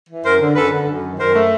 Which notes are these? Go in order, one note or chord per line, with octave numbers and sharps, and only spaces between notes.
E3
F#2 A#4 C5
D3
F#2 A4 B4
D3
F#2
D#3
F#2 A#4 C5
A3